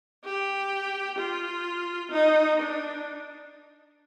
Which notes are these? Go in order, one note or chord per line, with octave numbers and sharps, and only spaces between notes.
G4
F4
D#4
D4